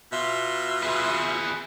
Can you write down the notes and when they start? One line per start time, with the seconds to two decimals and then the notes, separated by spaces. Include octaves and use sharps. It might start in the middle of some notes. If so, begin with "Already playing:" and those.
0.13 B2 F4 E5
0.83 G#4 B4